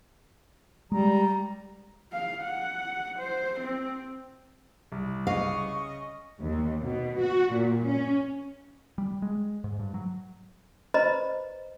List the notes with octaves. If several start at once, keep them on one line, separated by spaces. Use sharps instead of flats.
G3 G#3 A#5
F5
F#5
C5
C4
C2
C#3 D#5 F5 C#6
D#2
B2
F#4
A#2
C#4
G3
G#3
G#2
G2
F#3
B4 C5 D#5 A#5 B5